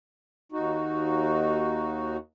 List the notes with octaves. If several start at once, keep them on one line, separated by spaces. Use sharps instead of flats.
D#2 D#4 F#4